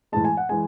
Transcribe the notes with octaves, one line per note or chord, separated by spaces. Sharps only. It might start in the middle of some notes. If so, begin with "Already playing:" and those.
A2 E3 G#3 A5
G#5
F#5
E3 G#3 G#5